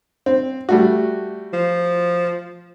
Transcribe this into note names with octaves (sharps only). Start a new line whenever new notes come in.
C4
G3 A3 F#4
F3